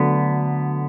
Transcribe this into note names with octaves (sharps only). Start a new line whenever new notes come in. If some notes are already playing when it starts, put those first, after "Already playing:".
Already playing: D2 D3 F#3 B3